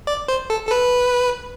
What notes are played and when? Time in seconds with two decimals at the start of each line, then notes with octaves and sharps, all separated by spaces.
0.07 D5
0.28 C5
0.50 A4
0.67 A4
0.71 B4